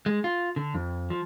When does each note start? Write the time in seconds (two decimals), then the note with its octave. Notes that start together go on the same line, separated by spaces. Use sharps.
0.06 G#3
0.24 F4
0.56 D3
0.74 F2
1.10 F3